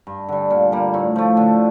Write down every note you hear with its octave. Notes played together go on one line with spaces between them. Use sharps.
G2
D3 G3
A#2
G3 A#3
A2
F3 A3
D3